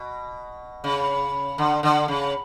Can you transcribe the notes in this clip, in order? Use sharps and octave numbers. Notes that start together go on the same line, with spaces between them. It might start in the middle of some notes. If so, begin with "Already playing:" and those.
Already playing: B2
C#3
D3
D3
C#3